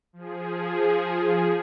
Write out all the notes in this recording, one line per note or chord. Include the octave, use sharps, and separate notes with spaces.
F3 G#4